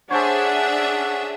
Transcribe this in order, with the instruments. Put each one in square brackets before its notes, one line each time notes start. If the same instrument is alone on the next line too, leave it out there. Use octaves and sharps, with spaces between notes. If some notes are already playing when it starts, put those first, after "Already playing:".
[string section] D4 G#4 E5 [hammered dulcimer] A4 C5 C#5 [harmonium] F#5